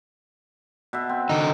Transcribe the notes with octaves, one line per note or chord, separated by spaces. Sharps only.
B2 E5
C4
D3 D#4